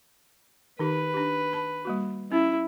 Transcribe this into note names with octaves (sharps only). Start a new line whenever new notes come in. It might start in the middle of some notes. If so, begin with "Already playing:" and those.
D#3 D#4 G4 B4
D4 G4
A5 B5
G3 A#3 F#4
C#4 E4